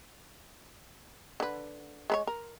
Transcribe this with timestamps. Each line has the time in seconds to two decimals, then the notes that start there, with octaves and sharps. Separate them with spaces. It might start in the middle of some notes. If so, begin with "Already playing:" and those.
1.40 D3 B4
2.10 G#3 B4 C#5
2.27 A#4